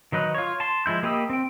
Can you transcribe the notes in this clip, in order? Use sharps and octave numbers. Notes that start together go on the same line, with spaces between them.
D#3 F#3 D#4 B4
F4 C#5
A5 C6
F3 G#3 E4 G6
A#3 G4 D#5 B5 E6
C4 G5